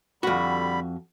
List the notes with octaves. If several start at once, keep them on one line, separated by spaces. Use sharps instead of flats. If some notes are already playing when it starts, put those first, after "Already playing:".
F2 D3 G3 F#4 B5